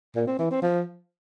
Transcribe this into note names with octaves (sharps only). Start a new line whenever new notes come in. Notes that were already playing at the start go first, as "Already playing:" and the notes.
A#2
C4
E3
C4
F3